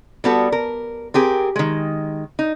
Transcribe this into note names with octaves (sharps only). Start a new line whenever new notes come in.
G3 B3 F#4 A4
A#4
C4 G4 G#4 A#4
D#3 G#3
D#4